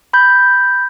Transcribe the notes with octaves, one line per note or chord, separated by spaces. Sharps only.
B5 G6